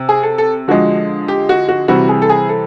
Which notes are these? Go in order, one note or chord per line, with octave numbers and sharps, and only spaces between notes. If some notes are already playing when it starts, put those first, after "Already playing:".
Already playing: C3
G#4
A4
A4
D3 F3 G#3 F#4
G4
F#4
F#4
C3 E3 G3 F#4
G#4
A4
G#4
A4